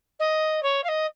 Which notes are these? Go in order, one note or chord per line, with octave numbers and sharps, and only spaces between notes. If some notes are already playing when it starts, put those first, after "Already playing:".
D#5
C#5
F5
D#5